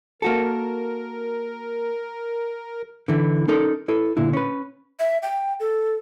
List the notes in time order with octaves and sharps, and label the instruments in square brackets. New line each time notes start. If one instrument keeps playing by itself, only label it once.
[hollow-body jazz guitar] A#3 F#4 A4 [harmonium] A#4
[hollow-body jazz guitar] D3 E3 E4
C#4 D#4 A4 A#4
E4 A4 B4
A#2 D3 E4
C#4 B4
[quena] E5
G5
A4